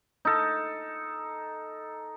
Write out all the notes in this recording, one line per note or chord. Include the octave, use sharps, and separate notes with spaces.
D#4 A4